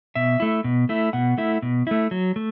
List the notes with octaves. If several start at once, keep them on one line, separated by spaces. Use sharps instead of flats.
B2 E5
A3 E4
B2
A3 E4
B2 F#5
A3 E4
B2
A3 E4
F#3
A3